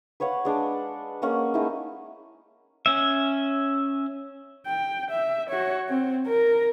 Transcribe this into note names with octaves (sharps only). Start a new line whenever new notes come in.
B4 C#5 F5 F#5
G#3 D4 D6
G#3 A#3 C#4 F#5
G#3 A3 D#4 E4
C#4 E5
G5
E5
F#4 C#5
C4
A#4